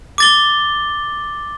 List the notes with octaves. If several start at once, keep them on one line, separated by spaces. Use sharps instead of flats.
D6 A6 G7